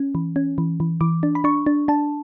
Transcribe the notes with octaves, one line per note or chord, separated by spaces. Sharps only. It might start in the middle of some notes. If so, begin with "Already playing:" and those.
Already playing: C#4
E3
C#4
E3
E3
E3 D6
D4
B5
D4 C#6
D4
D4 A5